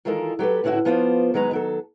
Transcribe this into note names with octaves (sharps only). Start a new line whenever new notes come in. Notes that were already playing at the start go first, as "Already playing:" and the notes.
D#3 E3 G#3 F4 A4 A#4
F#3 G4 A4 B4
A2 D3 C#4 E4 F#4
F3 B3 F4 C5 D5
D#3 F#3 G#3 B4 A#5
D#3 F#3 A4